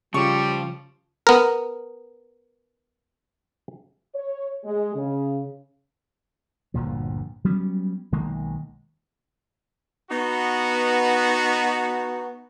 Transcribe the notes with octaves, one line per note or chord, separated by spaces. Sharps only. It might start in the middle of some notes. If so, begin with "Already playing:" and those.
C#3 F3 G3 F4 C#6
B3 A#4
C#5
G#3
C#3
G1 D2 A#2 F3
F#3 G3 B3 C#4
B1 D#3 G#3 A#3
B3 D#4 F#4